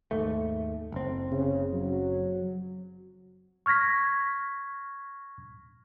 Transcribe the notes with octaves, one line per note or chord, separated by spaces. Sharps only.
D#2 G#2 A3
F#1 C4
C#3
F#3
C#6 F6 G#6 A#6 B6